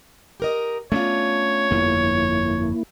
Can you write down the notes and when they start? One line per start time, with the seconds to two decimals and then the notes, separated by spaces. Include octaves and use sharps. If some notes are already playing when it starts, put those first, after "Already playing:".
0.40 G4 A#4 D#5
0.92 A3 B3 C#4 D4 F4 C#5
1.71 G1 F2 A#3 B3 E4